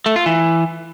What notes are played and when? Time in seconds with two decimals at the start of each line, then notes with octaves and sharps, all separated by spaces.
0.06 A3
0.16 F4
0.26 E3